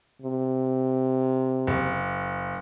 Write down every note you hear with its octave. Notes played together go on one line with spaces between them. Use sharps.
C3
F#1